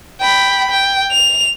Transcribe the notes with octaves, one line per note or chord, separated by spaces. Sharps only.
G5 B5
G5
F7